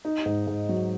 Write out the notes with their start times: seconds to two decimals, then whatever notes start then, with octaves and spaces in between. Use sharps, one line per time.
0.05 D#4
0.26 G#2
0.47 G#2
0.69 F#3